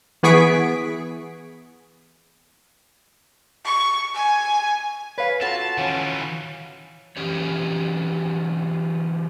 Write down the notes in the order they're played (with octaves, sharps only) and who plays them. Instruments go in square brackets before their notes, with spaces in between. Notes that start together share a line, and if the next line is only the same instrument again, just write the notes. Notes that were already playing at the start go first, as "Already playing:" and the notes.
[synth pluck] E3 B3 G#4 C#6 B6 D7
[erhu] C#6
G#5
[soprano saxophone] B4 [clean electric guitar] C#5 F5
[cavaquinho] F4 F#4 [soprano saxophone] A4 [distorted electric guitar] A5
[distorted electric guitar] D#3 E3 [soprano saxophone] C#4
[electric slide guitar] E3 F#3 C#4 G4 C#5